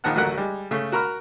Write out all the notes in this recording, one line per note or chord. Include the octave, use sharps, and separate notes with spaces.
A#1 D#3 F3 F#5 A5 F#6
A1 D2 F#3 A3 A#4 F#5
G3 G#3
C#3 A3
F#4 A#4 A#5 B5 F6